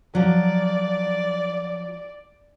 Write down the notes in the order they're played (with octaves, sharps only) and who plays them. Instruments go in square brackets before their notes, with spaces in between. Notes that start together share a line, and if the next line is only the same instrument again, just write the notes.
[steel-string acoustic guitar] F3 F#3 [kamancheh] D5